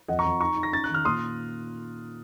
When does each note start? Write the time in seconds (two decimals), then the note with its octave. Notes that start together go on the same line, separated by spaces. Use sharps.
0.08 F2 D#5 F#5
0.19 A#5 C#6
0.25 F2
0.41 D#4 A#5 C#6
0.57 D#4
0.63 A#6
0.72 C#4 A6
0.84 F#6
0.89 D#3
0.94 F6
1.05 A#2 C6 D#6